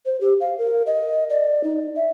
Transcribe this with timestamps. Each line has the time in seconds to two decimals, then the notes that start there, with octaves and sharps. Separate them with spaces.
0.06 C5
0.21 G4
0.40 F5
0.58 A#4
0.86 D#5
1.30 D5
1.64 D#4
1.96 E5